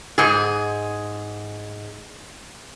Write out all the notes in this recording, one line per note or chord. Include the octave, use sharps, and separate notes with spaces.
G#2 G#4